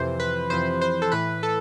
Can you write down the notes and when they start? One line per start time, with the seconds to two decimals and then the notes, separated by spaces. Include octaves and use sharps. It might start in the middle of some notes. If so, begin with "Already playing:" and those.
Already playing: F2 C3 E3 C5
0.20 B4
0.50 F2 C3 E3 C5
0.81 C5
1.02 A4
1.12 A2 E3 B4
1.43 A4